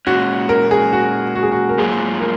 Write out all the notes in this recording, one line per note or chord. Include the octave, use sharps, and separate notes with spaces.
A#2 G#3 C#4 F#4
A#4
G#4
F#4
F#4
G#4
F#4
A#4
G#2 F#3 A#3 F4 G#4
A#4